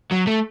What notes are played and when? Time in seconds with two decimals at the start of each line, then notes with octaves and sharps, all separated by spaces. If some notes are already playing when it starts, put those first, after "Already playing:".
0.11 F#3
0.27 A3